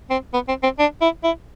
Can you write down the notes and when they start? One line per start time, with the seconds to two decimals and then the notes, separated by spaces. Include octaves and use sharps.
0.10 C4
0.34 B3
0.48 C4
0.63 C4
0.79 D4
1.01 E4
1.24 E4